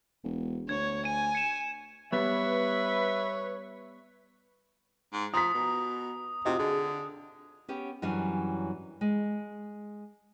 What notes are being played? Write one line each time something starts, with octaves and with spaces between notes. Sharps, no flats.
E1
D2 C#5 G#6
G#5 D#7
C#7 E7
G3 B3 B4 C#5 E5
G#2
F3 A#5 D#6 B6
B2
C3 F4 F#4 D#5
D3 G#4
B3 C#4 G4
F#2 E3 F#3 G3 D4 G#5
G#3